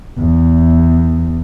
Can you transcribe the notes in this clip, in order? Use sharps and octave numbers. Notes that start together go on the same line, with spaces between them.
E2